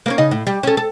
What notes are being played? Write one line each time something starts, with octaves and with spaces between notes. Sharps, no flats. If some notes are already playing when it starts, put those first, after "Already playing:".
A#3 B3 C#4
C#3 D#4 D#5
A2
G3
C#4 A4
A4